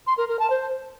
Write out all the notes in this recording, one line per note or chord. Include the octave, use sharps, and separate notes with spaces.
C6
A#4
A#4
A5
C5